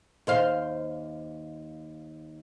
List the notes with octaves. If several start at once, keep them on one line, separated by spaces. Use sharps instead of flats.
D#2 C5 F5